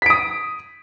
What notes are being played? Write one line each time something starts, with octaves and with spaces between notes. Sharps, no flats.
D#6 B6 D7